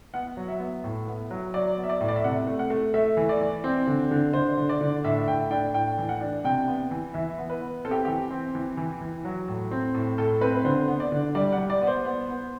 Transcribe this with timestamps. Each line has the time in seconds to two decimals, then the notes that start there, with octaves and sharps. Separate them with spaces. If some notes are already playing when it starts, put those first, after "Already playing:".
0.14 B3 F#5
0.37 F#3
0.48 E5
0.60 B3
0.84 A2
1.07 B3
1.30 F#3
1.54 F#3 D5
1.77 B3
1.84 E5
1.89 D5
2.00 A2
2.08 D5
2.16 E5
2.24 C3 F#5
2.47 A3
2.59 F#5
2.70 A3
2.94 A3 E5
3.17 E3
3.29 D5
3.41 E3
3.64 C4
3.87 D3
4.11 D3
4.33 D3 C5
4.57 D3
4.69 D5
4.81 D3
5.04 A2 E5
5.27 A2 G5
5.51 D4 G5
5.74 A2 G5
5.98 E3
6.09 F#5
6.21 D4
6.44 C3 G5
6.68 B3
6.91 E3
7.14 E3 E5
7.38 B3
7.50 B4
7.61 B3
7.85 C4 A4
7.91 G4
8.05 E3 G4
8.31 C4
8.54 E3
8.77 E3
9.01 E3
9.24 F#3
9.48 A2
9.71 C4
9.94 A2
10.18 A2 A4
10.41 C4 B4
10.55 B4
10.65 D3 C5
10.88 B3
11.00 D5
11.12 D3
11.35 G3 D5
11.52 F#5
11.58 G3
11.70 D5
11.82 B3
11.87 C5
12.05 B3
12.29 B3